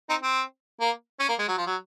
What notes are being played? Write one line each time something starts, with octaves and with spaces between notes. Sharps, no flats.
C4 D#4
C4
A#3
C#4
A#3
G#3
F#3
F3
F#3